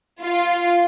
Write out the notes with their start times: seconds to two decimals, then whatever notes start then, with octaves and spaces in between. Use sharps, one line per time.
0.23 F4